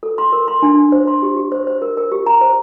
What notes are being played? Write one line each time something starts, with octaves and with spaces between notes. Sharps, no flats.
A4
C6
A#4
C6
D4
D4
C5
C6
G4
G4
C5
C5
A#4
A#4
G4
A#5
C5